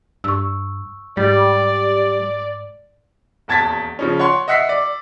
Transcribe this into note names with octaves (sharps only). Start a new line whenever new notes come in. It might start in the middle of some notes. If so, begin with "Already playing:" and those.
G2 C#6 E6
G#2 G3 D5
D#1 E2 A5 G#6 A6 B6
C#3 F3 C#4
C#5 F#5 C6
D#5 E5 F#5 E6 B6 C7
D5